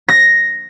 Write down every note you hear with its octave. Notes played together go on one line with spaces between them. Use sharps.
A#6